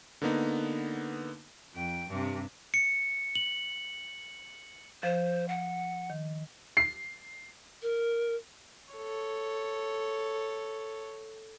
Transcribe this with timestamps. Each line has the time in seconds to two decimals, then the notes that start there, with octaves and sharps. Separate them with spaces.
0.22 D3 A#3 B3 D#4
1.74 F2 G5
2.09 G2 C3
2.74 C#7
3.36 F#7
5.03 F3 C5
5.49 F#5
6.10 D#3
6.77 C7
7.82 A#4
8.93 A4 C#5